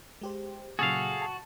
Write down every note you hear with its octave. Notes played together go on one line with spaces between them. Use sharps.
G#3 G4 C5
A#2 C#3 F#3 F#4 G#4 A4 F5
A5